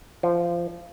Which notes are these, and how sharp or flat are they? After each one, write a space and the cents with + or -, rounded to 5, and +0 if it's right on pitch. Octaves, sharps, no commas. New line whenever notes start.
F3 -20